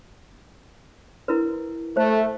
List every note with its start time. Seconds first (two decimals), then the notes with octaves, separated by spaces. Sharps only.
1.28 E4 A#4 B4
1.97 A3 C5